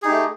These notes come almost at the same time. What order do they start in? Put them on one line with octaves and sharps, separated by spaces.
G#4 D#4 G4 A3